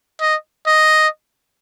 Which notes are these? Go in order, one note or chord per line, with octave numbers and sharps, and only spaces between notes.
D#5
D#5